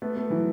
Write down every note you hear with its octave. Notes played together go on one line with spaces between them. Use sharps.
A3 B3
A3 B3
E3 F#3